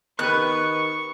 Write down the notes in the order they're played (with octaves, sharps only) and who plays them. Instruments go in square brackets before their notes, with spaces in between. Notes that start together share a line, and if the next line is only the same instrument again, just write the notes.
[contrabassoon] D#3 [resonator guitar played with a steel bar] B3 G4 B4 [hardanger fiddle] C#6 [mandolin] F#6